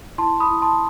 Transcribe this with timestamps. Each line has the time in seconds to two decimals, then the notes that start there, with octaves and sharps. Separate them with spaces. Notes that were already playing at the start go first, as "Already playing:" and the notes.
0.18 E4 A5 C6
0.40 B5 D#6
0.47 E4
0.62 A5 C6